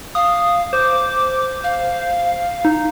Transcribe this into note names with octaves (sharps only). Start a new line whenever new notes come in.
F5 D#6
C5 D6
F5
D#4